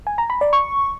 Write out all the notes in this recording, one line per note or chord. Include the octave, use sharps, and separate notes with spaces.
G#5
A#5
B5
D5
C#6